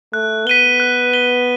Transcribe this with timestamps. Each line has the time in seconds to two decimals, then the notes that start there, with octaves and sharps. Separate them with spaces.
0.13 A3 F#6
0.47 B3 B6 D#7 G7
0.80 F#6
1.14 B6 D#7 G7